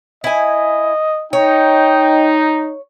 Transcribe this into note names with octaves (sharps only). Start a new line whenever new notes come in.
E4 D#5 G#5
D#4 C#5 G5